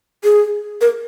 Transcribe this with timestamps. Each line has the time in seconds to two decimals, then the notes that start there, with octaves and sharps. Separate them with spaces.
0.24 G#4
0.81 A#4